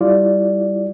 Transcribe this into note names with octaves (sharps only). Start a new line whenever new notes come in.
G3 E4 F4 D5